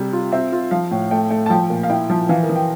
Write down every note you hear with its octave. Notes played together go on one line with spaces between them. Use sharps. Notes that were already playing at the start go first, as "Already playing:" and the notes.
Already playing: C3 G3
F4
C4 E5
F4
F3 F5
A2
A3 G5
A3
A5
F3 G5
A#2
F5
E4 G5
F3
E3 F5
A#4
E3
G5